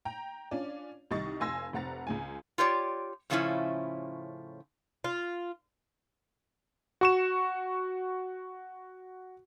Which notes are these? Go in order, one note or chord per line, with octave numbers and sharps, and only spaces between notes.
G5 A#5
C#4 D4 F4 D5
C2 D#3 G3 D#5 C#6 A6
F1 F5 G#5 C6 E6 A#6
F1 C3 F#5 A#5 A6
C#2 G#3 G#5
F4 G4 C#5 D5
A2 C#3 F3 A3 C#4 E4
F4
F#4 C#6 E7